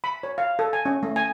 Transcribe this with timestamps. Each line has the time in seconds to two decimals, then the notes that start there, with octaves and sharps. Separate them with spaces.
0.04 B5
0.23 C#5
0.38 F5
0.59 A4
0.73 G#5
0.85 C#4
1.03 A3
1.16 G#5